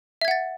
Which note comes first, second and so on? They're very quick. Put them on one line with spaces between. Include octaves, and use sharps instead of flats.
E5 G#6 F#5 A6